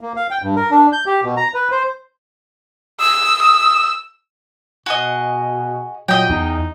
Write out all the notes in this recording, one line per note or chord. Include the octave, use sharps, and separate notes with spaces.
A#3
F5
G5
G2
A#4
D4
G6
G4
B2
A#5
B4
C5
D#6 E6
E6
B2 F#4 G#4 D#5
A#2 F#3 D#5 G5
E2 D#4